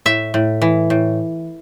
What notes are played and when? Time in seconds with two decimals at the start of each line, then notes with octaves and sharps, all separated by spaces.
0.06 A2 E5
0.34 A2
0.62 E3
0.90 A2